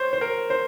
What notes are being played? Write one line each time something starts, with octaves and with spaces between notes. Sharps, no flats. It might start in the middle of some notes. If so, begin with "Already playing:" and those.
Already playing: C5 C#5
C5
A#4
C5